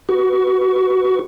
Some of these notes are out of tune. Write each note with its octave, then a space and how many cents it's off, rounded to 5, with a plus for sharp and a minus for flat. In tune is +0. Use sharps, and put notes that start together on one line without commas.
F#4 +10 B4 +0 C#6 +25